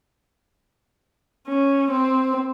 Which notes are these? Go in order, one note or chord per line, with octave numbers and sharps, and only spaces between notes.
C#4
C4